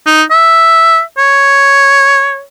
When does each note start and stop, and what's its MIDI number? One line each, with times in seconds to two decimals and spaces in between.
0.07 0.22 63
0.31 1.01 76
1.18 2.42 73